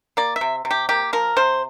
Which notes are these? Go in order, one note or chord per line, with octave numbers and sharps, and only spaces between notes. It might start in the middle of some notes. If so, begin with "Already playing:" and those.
A#3 D5
E5
C3
C3
G4
A#3 G4
F3 A#4
C3 C5